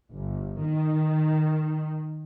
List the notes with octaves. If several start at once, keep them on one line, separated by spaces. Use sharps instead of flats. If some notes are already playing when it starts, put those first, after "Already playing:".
G1
D#3